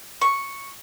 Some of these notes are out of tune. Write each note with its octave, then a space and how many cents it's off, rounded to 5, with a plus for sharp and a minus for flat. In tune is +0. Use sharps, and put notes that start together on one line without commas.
C#6 +0